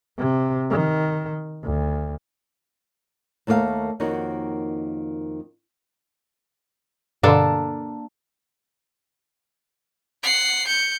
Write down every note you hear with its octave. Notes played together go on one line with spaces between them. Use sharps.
C3
D#3
D2
D#2 A3 A#3 D5 F5
F2 D#3 A#3 D#4 F#4 C#5
G2 B2 D3 A#3 D4 A4
F#5 C7
G6 C#7